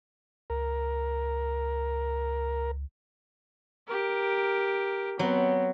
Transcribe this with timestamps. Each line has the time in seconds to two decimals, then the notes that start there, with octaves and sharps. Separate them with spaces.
0.50 C#2 A#4
3.87 G4 A#4
5.19 F#3 B3 C4